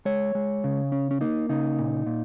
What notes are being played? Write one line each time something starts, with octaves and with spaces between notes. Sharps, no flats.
G#3 C#5
G#3
C#3
C#4
C#4
A#3 D#4
C#3 D#4
A#2
A#2